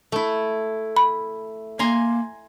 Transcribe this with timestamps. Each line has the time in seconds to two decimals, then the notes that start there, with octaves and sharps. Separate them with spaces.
0.12 A3 E4
0.97 B5
1.79 A#3 G#5 A#5 C6